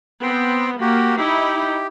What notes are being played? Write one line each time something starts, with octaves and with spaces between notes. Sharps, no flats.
B3 C4 C5 G5
A#3 F#4 G4
D#4 E4 G4